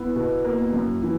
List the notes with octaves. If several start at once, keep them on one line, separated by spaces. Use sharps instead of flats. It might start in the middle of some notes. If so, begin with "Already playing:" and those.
Already playing: B3 E4
B2
A#3
F#2
E3